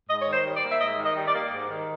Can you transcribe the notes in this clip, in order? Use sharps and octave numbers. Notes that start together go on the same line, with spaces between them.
G#2 D#5
C#5
D#3
C5
G3
D5
A#3
E5
G#2 D#5
D#3
D#5
G3
D5
A#3
G#2
D#3